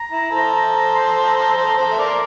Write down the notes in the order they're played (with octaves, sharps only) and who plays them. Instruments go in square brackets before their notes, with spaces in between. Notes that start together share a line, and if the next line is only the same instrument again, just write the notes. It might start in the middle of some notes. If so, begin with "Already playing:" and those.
Already playing: [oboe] A#5
[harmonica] E4
A4 C5
[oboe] C6
A#5
[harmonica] A4 C5
A4 C5
E5
A#4 D5
[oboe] C6